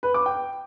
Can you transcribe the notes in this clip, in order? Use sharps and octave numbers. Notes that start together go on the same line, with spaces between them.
B4
D6
G5